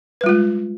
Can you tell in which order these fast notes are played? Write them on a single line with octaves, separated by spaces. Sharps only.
B4 G3 F4 G#3